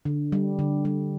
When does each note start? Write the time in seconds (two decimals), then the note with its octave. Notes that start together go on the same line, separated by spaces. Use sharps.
0.05 D3
0.32 G3
0.59 D3
0.85 G3